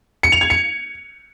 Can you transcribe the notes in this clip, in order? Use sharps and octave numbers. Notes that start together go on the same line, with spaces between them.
C#7
F7
G#6
C#7